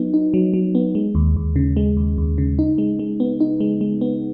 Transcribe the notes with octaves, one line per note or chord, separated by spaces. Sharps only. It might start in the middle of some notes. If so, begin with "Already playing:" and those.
Already playing: F#3 B3 D#4
D#4
F#3
F#3
B3
G#3
D#2
D#2
C#3
G#3
D#2
D#2
C#3
D#4
G#3
G#3
B3
D#4
G#3
G#3
B3